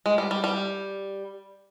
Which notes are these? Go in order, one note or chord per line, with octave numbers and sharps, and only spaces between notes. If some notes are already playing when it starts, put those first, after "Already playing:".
G#3
G3
G3
G3